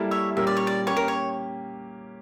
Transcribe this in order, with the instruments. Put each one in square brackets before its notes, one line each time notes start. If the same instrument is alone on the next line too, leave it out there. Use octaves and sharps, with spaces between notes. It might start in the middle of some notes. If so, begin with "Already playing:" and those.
Already playing: [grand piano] G3 A#3 E4 A4
[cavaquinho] C#5 E5
[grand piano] A#2 G3 C#4 G4 A#4 [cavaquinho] E5
[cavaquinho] D5
C#5
D5
[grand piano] A#3 C#4 G4 [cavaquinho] C#5
[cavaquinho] A#4
C#5